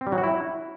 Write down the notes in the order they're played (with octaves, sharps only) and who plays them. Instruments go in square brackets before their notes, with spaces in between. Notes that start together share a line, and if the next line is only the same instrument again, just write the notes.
[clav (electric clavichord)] C4
G3
F#3
F#4
E4